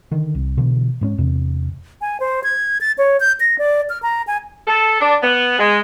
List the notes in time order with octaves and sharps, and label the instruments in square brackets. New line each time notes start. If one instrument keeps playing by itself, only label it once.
[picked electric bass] D3 D#3
C2
B2 D3 E3
G#2 B3 C#4
E2 C3
[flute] G#5
C5
G#6
A6
C#5
G6
A#6
D5
F6
A#5
G#5
[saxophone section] A4
D4
B3
G#3